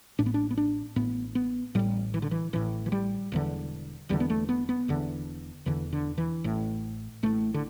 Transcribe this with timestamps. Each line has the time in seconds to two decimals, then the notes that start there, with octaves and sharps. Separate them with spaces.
0.19 A1 A2 D4
0.26 B3
0.34 D4
0.51 B3
0.57 D4
0.96 A1 A2 B3
1.35 B3
1.75 A1 A2 G3
2.14 E3
2.22 D3
2.31 E3
2.53 A1 A2 E3
2.86 E3
2.92 G3
3.32 E1 E2 D3
4.09 E1 E2 D3 G3
4.20 B3
4.30 A3
4.49 B3
4.69 B3
4.88 E1 E2 D3
5.66 E1 E2 D3 E3
5.93 D3
6.18 E3
6.44 A1 A2
7.23 A1 A2 A3
7.54 D3